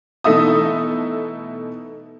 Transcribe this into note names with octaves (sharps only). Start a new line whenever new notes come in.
B2 E3 A3 D#4 E5 D#6